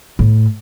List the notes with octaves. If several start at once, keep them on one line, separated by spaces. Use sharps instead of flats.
A2